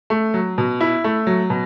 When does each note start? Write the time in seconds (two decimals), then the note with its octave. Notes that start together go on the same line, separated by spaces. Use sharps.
0.10 A3
0.34 F#3
0.58 B2
0.81 E4
1.04 A3
1.27 F#3
1.50 B2